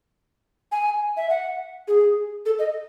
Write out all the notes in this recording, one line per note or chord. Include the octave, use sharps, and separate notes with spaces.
G#5
E5
F#5
G#4
A4
D#5